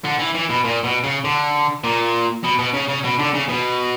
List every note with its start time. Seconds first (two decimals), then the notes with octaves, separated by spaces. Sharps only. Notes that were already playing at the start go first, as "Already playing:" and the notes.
0.05 D3
0.20 E3
0.35 E3
0.50 B2
0.65 A#2
0.84 B2
1.04 C#3
1.25 D3
1.84 A#2
2.44 B2
2.59 B2
2.74 C#3
2.88 C#3
3.04 B2
3.19 D3
3.34 C#3
3.48 B2